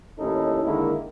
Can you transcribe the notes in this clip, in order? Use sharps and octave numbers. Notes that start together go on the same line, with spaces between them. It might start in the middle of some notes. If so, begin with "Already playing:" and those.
A1 D#2 C#4 D#4 E4 A4
D3 D#3 G#3 A#3 D#4 E4